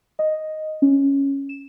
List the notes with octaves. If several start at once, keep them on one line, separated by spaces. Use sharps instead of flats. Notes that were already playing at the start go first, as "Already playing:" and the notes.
D#5
C#4
E7